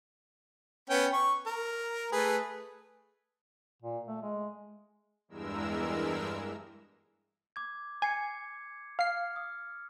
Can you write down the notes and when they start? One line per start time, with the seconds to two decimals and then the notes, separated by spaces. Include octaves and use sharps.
0.90 B3 C#4 G5
1.13 C#6
1.46 A#4
2.12 A3 G#4 B4
3.82 A#2
4.08 A3
4.22 G#3
5.28 E2 G2 E3 G#3 A#4 E6
7.56 D6 G#6
8.02 G#5 G#6 C7 C#7
8.99 F5 F6 C7
9.36 D#6